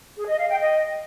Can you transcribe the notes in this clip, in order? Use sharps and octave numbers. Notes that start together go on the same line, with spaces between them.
G#4
D#5
F5
G5
D#5